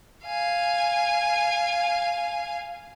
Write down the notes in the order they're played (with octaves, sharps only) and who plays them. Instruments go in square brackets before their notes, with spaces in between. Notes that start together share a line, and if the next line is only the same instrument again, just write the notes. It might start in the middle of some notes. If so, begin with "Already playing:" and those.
[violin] F5 G#5